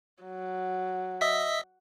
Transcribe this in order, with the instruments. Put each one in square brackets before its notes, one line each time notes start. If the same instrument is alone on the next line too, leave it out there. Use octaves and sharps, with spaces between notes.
[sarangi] F#3
[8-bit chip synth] D#5 E5 B6